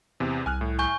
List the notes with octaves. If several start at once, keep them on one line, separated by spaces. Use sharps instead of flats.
E2 C3
C2 G#5 F6 F#6
A2
G#5 C#6 G6